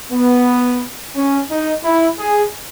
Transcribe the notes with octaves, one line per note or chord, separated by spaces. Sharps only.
B3
C#4
D#4
E4
G#4